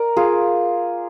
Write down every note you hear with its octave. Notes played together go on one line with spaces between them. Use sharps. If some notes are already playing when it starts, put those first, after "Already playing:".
Already playing: A#4 D5
F4 G#4